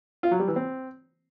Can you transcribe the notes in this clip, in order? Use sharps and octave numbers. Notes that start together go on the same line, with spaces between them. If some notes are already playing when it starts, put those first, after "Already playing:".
F4
F#3
G3
E3
C4